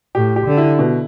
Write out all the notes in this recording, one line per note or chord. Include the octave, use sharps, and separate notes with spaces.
A2 G4
G4
D3
E4
B2